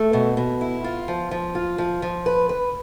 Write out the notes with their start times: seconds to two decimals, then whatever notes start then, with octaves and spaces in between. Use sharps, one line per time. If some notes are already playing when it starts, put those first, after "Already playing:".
Already playing: A3
0.13 B2
0.37 B2
0.61 E4
0.84 F4
1.08 F3
1.31 F3
1.55 F4
1.78 F3
2.02 F3
2.26 B4
2.49 B4